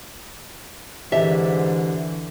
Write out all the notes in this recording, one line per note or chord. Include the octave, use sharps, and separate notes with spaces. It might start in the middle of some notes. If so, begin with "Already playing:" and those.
G#2 D3 E3 G4 E5